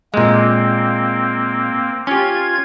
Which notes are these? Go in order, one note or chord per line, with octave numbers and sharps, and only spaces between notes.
A#2 G#3 A#3 C4
C#4 F4 G4 G#6